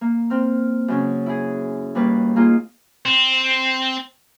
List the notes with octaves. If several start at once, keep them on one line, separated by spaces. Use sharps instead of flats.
A#3
C4 F6
F#2 C#3 C#4
E4 G#4
D#2 G3 A#3 B4 C#5 F#6
A#3 D#4 F4 G#4
C4